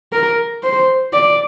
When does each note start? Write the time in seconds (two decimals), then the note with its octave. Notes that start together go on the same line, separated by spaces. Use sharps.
0.13 A#4
0.63 C5
1.14 D5